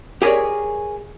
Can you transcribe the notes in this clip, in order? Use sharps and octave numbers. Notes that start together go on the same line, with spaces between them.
G4 G#4 A#4 C#5 D5